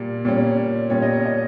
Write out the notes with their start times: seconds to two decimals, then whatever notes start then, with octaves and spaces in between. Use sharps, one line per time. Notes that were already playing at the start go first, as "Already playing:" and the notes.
Already playing: A#2 G3
0.25 A#2 G3 C#4
0.90 A#2 G3 C#4 C#5
1.02 D#5
1.13 C#5
1.25 D#5